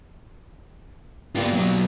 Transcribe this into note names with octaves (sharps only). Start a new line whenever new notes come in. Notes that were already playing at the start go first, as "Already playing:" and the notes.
G2 G3 A#3 B3 F4
B2 F#3